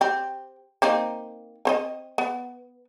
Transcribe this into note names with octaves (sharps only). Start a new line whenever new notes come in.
C4 G4
A#3 C4 D#4
C4 C5 D#5
B3